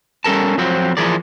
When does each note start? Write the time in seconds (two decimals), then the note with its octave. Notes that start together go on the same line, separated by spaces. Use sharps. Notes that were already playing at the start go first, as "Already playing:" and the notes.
0.24 G3 C#4 A4 A#4 A5
0.58 F2 F3 F#3 C4
0.97 E3 F3 G#4 A#4 D5